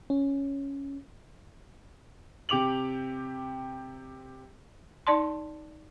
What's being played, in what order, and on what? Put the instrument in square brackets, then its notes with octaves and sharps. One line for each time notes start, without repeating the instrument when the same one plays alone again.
[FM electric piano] C#4
[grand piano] C3 G4 D6 F7 F#7
[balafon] D#4 D5 A5 C6